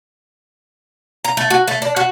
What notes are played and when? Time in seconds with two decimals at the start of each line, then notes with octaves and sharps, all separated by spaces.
1.25 A#5
1.37 A3
1.50 F#4
1.68 A3
1.82 D4
1.96 F#4